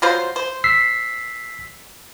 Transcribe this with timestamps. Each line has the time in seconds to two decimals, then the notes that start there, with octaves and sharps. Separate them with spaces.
0.02 F#3 F4 C5
0.36 C5
0.64 E6 B6 C7